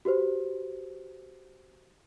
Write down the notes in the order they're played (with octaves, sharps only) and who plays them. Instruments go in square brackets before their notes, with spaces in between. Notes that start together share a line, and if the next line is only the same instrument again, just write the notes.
[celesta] F#4 G4 B4 C5